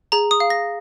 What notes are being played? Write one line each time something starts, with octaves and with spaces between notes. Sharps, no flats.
G#4 A#5
D#6
F5
A#6